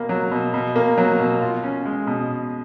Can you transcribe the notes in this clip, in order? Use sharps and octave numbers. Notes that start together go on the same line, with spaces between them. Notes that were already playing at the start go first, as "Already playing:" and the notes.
Already playing: B2 A#3
F#3
B2
B2
A#3
F#3
B2
F4
C#4
G#3
B2